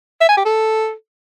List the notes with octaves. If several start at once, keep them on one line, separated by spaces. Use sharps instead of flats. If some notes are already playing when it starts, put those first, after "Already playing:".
E5
G#5
G4
A4